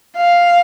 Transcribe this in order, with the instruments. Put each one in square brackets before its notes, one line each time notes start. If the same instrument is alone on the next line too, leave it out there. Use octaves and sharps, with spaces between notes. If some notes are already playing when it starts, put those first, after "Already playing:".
[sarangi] F5